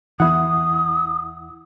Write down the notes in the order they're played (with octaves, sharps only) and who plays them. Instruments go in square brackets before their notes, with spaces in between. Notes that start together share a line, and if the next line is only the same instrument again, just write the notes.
[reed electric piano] E2 E4 F#5 [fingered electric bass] E3 [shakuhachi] D#6